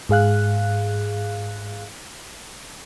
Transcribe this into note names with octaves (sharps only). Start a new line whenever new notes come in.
G#2 G#4 F5 F#6